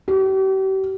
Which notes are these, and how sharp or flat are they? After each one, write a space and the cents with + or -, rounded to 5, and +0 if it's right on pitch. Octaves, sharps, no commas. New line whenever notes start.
G4 -40